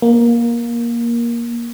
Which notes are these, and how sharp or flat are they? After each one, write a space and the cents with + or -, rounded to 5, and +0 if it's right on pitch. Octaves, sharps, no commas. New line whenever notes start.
A#3 +10